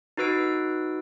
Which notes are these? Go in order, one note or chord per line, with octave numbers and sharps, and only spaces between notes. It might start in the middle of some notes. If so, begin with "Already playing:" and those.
D#4 F#4 B4 E6 D7